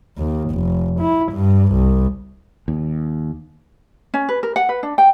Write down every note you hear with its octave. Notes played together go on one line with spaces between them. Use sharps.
D#2
F1
E4
G2
C2
D#2
C#4
B4
A#4
F#5
B4
D4
G5